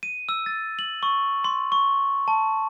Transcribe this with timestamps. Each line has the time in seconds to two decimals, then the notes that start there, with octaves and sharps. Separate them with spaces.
0.03 D#7
0.29 E6
0.46 A6
0.79 F#7
1.03 C#6
1.44 C6
1.72 C#6
2.28 A5